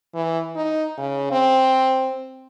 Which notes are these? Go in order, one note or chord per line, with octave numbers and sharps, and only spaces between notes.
E3
D#4
C#3
C4